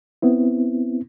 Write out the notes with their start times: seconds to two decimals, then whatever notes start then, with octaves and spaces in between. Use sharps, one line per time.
0.22 B3 C4 E4